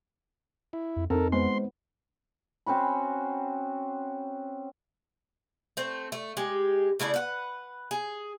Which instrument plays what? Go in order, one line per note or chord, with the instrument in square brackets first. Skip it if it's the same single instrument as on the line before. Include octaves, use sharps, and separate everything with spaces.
[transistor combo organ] E4
[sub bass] F2
[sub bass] F2 [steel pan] C4 D#4 [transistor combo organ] A4 A#4
[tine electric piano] G#3 C5 [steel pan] B3 [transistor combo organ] C6
[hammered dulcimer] C4 C#4 F#4 B5
[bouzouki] A3 C4
A3
G#3 G4
C#3 A3 E4 D5
B4 F#5
G#4